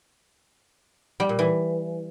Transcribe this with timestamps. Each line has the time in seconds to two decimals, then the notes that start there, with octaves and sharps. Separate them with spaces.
1.20 G3
1.29 A#2
1.39 E3